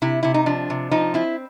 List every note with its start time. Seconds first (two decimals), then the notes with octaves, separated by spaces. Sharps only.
0.02 C3 E4
0.23 C3 E4
0.34 D#4
0.46 F3 D4
0.70 C3
0.91 F3 D#4
1.14 C4 E4